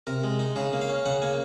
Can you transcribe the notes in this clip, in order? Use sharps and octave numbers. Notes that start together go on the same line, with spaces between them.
C3 A#4
G#3
D#4
C#3 G#4
A#3
F5
C#4
C#3 F#5
A#3 G#5